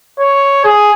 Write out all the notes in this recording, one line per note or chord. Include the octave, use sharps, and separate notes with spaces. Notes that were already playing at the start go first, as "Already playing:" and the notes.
C#5
G#4